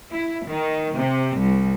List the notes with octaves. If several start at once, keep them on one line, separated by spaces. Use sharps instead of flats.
E4
D#3
C3
C2